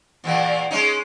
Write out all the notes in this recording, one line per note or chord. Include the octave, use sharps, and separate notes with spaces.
E2 A#2 E3
G#3 C#4 D#4